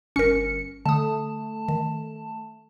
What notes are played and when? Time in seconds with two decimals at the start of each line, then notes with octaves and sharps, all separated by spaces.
0.16 G1 C#4 A#4 C#7
0.86 D3 A3 A5 D#6
1.68 D#3